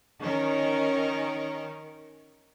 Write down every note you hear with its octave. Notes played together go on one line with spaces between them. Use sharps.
D#3 C#4 A#4